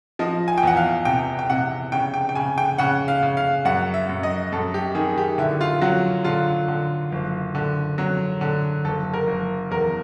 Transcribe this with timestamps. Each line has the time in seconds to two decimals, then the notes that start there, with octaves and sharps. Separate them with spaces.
0.19 F3 D#5
0.48 G#5
0.58 G5
0.63 E2 F#5
0.77 F5
1.05 C3 G5
1.39 G5
1.50 C3 F#5
1.92 C#3 G5
2.14 G5
2.29 G5
2.35 C#3 G#5
2.58 G5
2.78 C#3 F#5
3.08 F5
3.23 C#3
3.37 F5
3.65 F#2 F#5
3.94 E5
4.09 F#2
4.23 D#5
4.52 F#2 A4
4.74 G4
4.95 D#3 G#4
5.18 G4
5.38 D3 E4
5.61 F4
5.81 F#3 F#4
6.24 D3 F4
6.68 D3
7.12 F#1
7.55 D3
7.98 F#3
8.41 D3
8.84 F#1 A4
9.14 A#4
9.27 F#1
9.71 E2 A#4